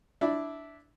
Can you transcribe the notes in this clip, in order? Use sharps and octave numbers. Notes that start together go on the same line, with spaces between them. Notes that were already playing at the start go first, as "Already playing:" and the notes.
D4 E4 D5